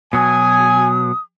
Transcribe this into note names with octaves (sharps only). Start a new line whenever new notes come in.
B2 F#3 G#5 D#6